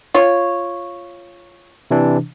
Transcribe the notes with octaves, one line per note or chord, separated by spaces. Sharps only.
F4 C#5
C3 E3 D4